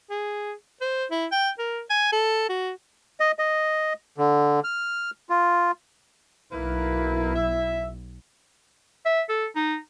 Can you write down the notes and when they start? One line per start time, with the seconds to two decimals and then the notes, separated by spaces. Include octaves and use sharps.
0.11 G#4
0.81 C5
1.11 E4
1.32 G5
1.59 A#4
1.90 G#5
2.12 A4
2.49 F#4
3.20 D#5
3.39 D#5
4.18 D3
4.64 F6
5.29 F4
6.52 B1 A#3 E4 A#4 B4
7.35 E5
9.05 E5
9.29 A4
9.56 D#4